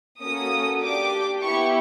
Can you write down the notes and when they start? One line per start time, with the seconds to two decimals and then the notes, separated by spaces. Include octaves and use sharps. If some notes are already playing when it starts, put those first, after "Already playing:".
0.21 A#3 C#4 F#4 A4 D#6
0.81 D4 G4 D6
1.42 B3 E4 G4 C#6